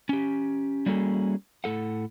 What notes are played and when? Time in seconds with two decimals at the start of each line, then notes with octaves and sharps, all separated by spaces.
0.09 C#4 G4
0.86 G3 A#3 C#4 F#4 G#4 A4
1.64 A2 A4 F#5